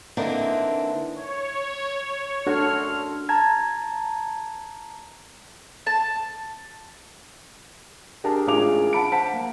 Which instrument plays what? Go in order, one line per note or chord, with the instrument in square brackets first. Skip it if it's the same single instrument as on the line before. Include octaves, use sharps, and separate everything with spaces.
[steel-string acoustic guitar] D3 E3 A#3 C4 D4 D#4
[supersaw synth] C#5
[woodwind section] F#2 C6 F6 [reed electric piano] D4 F#4 [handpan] A4
[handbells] A5 A#5 G#6
[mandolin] A5
[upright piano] D4 G4 G#4 A#4 A5
A1 G#3 F4 G#5 D6 F7
F#5 A5 B5 D7
C5 F#5 A5 B6
A#3